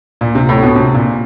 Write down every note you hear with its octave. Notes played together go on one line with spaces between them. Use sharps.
A#2
C3
A2
B2
C3
A#2